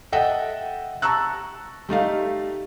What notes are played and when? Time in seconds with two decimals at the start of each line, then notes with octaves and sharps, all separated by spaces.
0.12 A4 D#5 E5 F#5 G5
1.02 A5 A#5 C#6 E6 F#6
1.89 G3 A3 D#4 F5